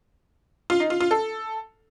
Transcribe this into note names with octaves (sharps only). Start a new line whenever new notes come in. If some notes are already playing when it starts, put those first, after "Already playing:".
F4
D#4
F4
F4
A4